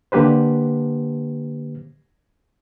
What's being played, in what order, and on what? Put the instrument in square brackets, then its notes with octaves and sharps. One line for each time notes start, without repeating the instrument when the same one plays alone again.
[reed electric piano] D3 A#3 G4 B4 C5